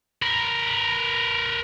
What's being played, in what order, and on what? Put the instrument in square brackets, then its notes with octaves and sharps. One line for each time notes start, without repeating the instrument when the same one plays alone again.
[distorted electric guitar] A#4 B4